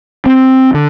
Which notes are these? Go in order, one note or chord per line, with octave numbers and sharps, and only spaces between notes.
C4
D3